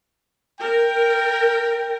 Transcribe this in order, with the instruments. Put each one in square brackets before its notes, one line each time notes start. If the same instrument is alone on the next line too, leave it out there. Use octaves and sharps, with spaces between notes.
[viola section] A#4 [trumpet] G5